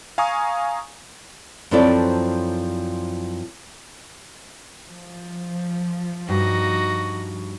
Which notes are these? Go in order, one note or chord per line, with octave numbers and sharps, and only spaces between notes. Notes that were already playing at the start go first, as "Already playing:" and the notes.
F5 G#5 A#5 C#6 D#6
F#2 F3 C4 E4 A4 D5
F3
G2 D#4 F#4